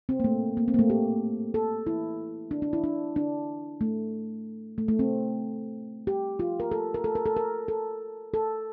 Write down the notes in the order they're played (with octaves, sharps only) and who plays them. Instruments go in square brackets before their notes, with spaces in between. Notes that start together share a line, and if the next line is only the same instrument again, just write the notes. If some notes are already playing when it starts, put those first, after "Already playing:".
[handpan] C4
A#3
A3
A#3
C4
A#3
A3
G4
A4
E4
D4
D4
E4
D4
D4
A3
A3
A3
C4
G4
F4
A#4
A4
A#4
A4
A#4
A4
A#4
A4
A4